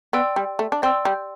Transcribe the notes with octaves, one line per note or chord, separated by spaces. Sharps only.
B3 D5 G5 C6 E6
G3
A3
D4
C4 D5 G5 C6 E6
G3